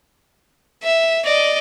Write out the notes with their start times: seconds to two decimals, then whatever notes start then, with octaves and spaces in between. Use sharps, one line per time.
0.83 E5
1.25 D5 D#5